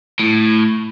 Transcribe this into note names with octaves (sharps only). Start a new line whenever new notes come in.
A2